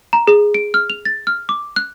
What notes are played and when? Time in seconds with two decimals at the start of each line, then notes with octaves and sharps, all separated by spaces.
0.13 A#5
0.27 G#4
0.54 D7
0.74 F6
0.90 F7
1.05 A6
1.27 F6
1.49 D6
1.76 F#6